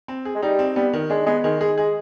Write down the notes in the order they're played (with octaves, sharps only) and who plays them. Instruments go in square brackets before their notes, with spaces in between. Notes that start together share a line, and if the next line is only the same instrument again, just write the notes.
[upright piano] C4
G#4
[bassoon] G#3
[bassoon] G3 [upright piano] D#4
[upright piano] C4
[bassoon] G3 [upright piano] B3
[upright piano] D#3
[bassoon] G#3 [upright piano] D4
[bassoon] G#3 [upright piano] B3
[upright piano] D#3 [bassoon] G#3
[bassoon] G#3 [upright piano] G#4
[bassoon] G#3 [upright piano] G#4